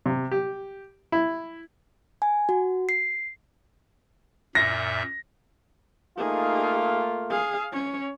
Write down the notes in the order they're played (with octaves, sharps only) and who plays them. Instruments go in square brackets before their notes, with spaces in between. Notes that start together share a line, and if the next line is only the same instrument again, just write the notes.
[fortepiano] C3
G4
E4
[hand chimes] G#5
F#4
C7
[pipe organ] F#2 A#2 E5 [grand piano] A#6
[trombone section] A3 A#3 F4 [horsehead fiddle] D#4 G#4
[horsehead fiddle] G#4 F5
C#4 C#5